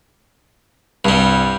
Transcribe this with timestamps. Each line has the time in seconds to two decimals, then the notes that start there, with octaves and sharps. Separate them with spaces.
1.05 C2 G2 G3